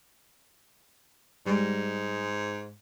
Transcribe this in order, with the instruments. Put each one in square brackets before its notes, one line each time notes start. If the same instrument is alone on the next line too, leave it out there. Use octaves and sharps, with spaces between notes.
[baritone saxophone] G#2 [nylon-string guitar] G3 G#3